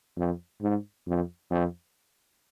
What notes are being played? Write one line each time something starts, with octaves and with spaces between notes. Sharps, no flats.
F2
G#2
F2
F2